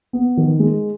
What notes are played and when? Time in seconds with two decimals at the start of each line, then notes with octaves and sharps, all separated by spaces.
0.13 B3
0.37 D#3
0.60 G#3